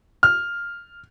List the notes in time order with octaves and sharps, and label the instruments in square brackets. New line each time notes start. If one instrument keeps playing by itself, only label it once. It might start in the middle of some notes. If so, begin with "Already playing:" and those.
[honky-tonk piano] F6